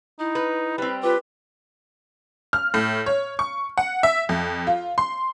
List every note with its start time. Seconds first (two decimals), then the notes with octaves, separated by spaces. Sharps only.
0.19 D#4 E4
0.35 B4
0.78 G3 C4 B4
1.03 F4 G4 B4
2.53 F6
2.74 A2
3.06 C#5
3.39 C#6
3.78 F#5
4.03 E5
4.29 F2
4.67 F4
4.98 C6